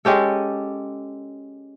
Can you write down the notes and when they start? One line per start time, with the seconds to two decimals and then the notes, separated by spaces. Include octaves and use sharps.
0.05 G#3 C#4 G4 A4